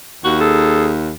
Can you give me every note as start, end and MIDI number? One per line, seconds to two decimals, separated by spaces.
0.24 1.12 39
0.24 0.38 66
0.41 0.93 68
0.41 0.88 69